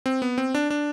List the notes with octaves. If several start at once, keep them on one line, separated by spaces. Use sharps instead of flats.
C4
B3
C4
D4
D4